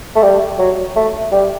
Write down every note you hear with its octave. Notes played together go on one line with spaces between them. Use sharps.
A3
G3
F#3
A3
G3